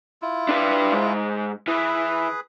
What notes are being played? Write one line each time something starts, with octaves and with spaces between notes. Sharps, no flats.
E4 F4
D4 B4
G#2
E3 G#4 B4